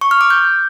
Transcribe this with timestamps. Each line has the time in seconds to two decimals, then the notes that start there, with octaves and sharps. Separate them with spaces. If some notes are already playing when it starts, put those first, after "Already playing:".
0.01 C#6
0.11 F6
0.21 D6
0.30 G6